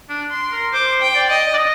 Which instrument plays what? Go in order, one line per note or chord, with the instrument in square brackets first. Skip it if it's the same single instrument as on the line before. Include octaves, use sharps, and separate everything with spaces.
[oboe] D4
[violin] C6
[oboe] A#4
[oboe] C5 [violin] D6
[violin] G5
[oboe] D5
[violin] D#5
[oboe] D5
D#5